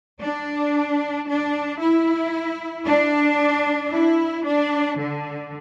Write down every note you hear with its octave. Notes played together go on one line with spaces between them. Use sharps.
D4
D4
E4
D4
E4
D4
D3